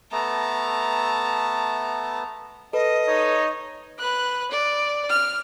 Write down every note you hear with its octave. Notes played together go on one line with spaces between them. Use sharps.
A3 B3 A5 A#5
A4 B4 D#5
D#4 C#5
B4 F#6
D5
F6